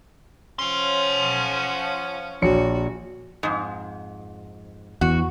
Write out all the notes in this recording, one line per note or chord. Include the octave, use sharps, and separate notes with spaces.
F3 C#4 F#5 C6
A#1 F#4 C#5 C#7
F2 G#2
E2 F#4